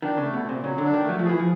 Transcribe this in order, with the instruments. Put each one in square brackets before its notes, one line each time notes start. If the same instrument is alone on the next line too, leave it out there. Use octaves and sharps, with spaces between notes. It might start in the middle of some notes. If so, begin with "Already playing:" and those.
[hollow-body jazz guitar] D#3 [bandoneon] D4
[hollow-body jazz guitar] C#3
[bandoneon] A3
[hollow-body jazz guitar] B2
[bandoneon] A#2
[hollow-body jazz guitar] C3
[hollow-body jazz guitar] C#3 [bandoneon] F#3
[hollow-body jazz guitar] D3
[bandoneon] D4
[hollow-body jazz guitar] D#3
[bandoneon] A3
[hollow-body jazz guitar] F#3
F3
[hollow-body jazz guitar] E3 [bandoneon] G#4
[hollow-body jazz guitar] F3